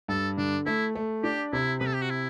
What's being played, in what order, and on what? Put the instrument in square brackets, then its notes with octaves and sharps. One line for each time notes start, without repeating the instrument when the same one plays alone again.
[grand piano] G2 [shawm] A4
[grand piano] D3 [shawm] D4
[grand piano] A3 [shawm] E4
[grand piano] A3
[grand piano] D4 [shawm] G4
[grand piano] C3 [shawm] E4
[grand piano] C3 [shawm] B4
[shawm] A4
G4
F#4
E4